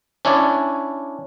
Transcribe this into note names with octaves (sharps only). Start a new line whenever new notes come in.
C#4 D4 E4 C#5 D5